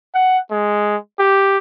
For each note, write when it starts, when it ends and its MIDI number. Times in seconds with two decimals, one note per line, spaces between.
0.15 0.38 78
0.51 0.97 56
1.19 1.58 67